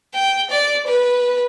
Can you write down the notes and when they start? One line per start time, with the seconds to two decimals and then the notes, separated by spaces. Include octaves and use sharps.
0.14 G5
0.50 D5
0.87 B4